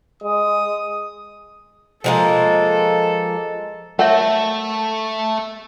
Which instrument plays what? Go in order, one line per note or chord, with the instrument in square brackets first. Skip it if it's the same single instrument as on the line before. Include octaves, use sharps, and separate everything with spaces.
[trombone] G#3 [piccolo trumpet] D#6
[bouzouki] F3 G#3 A#3 [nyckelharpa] A4
[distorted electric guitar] A3 [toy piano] A#4 C#5 E5 [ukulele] F#5